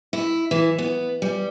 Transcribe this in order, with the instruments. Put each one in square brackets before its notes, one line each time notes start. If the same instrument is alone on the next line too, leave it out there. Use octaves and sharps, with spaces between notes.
[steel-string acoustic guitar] E4
E3
B3
G3